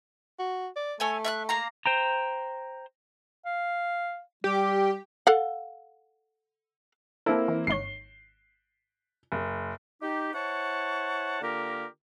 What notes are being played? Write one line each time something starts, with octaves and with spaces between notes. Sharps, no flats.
F#4
D5
A3 A4 C#5 G#5
E5 F6 F#6
A#3 F5 A#5
C5 G5 A#5
F5
G3 G4
A4 F5 F#5
A#3 C4 E4 A4
E3
G#1 D#4 C#5 C7 G7
F#1
D#4 G4
E4 C5 C#5 F#5 A5 C#6
D3 A#3 F4 G4 A#4